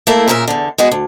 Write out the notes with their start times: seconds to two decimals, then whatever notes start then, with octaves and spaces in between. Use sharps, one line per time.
0.07 A3 A#3 E4
0.28 A#2 C#3 A#4 C5 E5
0.48 E2 D3
0.78 G#3 B3 F#4 G#4
0.92 D2